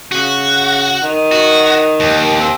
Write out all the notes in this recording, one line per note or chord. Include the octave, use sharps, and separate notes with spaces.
C#3 F#4
D#3
F#4
D#2
C4